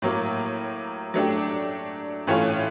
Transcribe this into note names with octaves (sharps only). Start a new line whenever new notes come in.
A2 F#3 A#3
F#3 A3 D4 G4
A2 E3 A3 C#4 F4